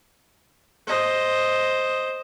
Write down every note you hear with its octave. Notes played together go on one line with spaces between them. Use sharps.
C5 D#5